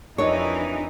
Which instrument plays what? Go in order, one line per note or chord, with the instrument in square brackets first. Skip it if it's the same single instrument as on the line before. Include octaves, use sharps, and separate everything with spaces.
[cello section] F2 E3 D#4 [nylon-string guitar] D4 C#5 [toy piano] G4 A#4 D#5